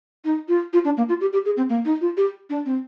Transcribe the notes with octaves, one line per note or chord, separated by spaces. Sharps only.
D#4
F4
F4
D4
A#3
F4
G4
G4
G#4
C4
A#3
D#4
F4
G4
D4
C4